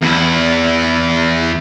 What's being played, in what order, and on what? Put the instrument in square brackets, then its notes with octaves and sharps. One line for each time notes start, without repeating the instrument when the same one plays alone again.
[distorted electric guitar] E2 E4